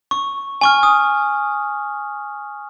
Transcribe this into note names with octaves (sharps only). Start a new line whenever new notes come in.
C#6
G#5 C#6 F6
D#6